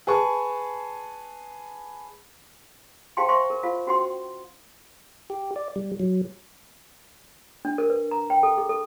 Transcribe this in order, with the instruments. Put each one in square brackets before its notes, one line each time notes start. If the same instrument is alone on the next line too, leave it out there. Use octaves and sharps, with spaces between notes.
[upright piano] G#4 B4 A5 C#6
[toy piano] G4 C5 F5 G5 A5 C6
C5 E5 F5 A5 C6 C#6
A#4
F4 C5 F5
C#4 F#4 C5 F#5 G5 C6
[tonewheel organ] G4
D5
G3
F#3
[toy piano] D4
A#4
B4
A#5
G5
A4
G#4
A4